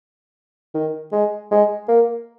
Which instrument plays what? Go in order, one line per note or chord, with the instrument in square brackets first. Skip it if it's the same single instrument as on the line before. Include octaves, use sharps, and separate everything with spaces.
[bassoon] D#3
G#3
G#3
A#3